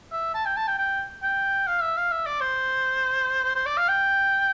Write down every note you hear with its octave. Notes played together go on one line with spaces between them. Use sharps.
E5
A5
G5
A5
G5
G5
G5
F5
E5
F5
E5
D5
C5
C5
C5
D5
F5
G5